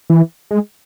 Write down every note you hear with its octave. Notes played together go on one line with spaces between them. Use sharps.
E3
G#3